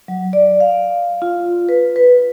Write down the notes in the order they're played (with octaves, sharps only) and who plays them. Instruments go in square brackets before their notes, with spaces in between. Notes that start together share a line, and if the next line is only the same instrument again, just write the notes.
[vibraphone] F#3
D5
F5
F4
B4
B4